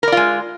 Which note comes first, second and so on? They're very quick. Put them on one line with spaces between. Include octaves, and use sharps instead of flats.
A#4 D5 F4 G#3